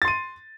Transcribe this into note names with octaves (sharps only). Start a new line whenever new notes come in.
C6 A6 D#7